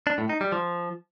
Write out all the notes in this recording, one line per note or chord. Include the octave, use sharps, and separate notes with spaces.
D4
A2
D#4
G3
F3